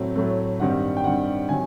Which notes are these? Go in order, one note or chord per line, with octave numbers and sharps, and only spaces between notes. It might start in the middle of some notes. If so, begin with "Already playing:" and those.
Already playing: A2 F#3 A3 C4
A2 F#3 A3 C4
G2 D#3 G3 C4 F#5
G5
G2 D#3 G3 C4 F#5
C3 D#3 F#3 G#5